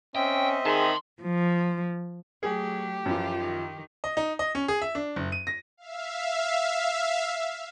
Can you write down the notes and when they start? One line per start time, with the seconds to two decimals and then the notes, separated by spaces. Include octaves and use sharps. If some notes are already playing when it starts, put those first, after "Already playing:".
0.16 C4 C#4 D#5 E5 G5
0.66 D#3 G#4 A5 C6
1.22 F3
2.43 F#3 A3 G4 G#4
3.06 F#2 E3 F3 F4
3.40 D#3
4.04 D#5
4.17 D#4
4.39 D#5
4.55 C#4
4.68 G#4
4.82 E5
4.95 D4
5.16 F#1
5.32 D#7
5.47 A#6
5.77 E5 F5